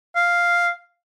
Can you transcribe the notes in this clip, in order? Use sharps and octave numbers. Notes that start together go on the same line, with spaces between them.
F5